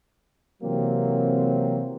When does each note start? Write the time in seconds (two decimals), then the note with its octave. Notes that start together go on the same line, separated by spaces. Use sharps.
0.63 C3 E3 F#3 A#3 C4